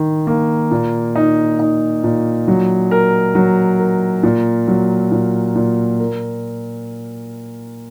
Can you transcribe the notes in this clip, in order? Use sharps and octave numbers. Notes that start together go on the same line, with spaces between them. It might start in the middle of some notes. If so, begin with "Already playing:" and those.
Already playing: D#3 D#4
A#3
A#2
D#4
D#4
A#2
F#3
A#4
F#3
A#4
A#2
F#3
A#2
A#2
A#4